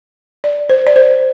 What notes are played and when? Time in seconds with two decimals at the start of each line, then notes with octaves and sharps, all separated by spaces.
0.44 D5
0.69 C5
0.87 D5
0.96 C5